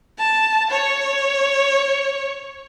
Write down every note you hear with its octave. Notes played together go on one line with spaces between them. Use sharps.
A5
C#5